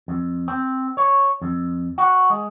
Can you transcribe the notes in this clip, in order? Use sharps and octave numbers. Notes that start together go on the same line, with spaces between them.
F2
C4
C#5
F2
F#4
G#3